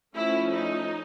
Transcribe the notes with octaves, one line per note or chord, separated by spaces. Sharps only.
F3 A3 C#4 E4
D#4